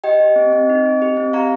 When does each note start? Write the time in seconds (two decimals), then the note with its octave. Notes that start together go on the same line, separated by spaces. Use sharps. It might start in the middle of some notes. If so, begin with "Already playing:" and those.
0.04 G4 D#5 G5
0.20 G4
0.36 C4
0.53 C4
0.69 D#4
0.86 C4
1.02 G4
1.17 C4
1.33 G4 F5 A#5